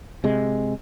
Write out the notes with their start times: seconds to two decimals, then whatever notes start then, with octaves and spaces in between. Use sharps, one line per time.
0.24 C3 G#3